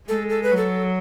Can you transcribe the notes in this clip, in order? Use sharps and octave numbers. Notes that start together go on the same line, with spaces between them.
G#3 A4
A4
B4
F#3
A4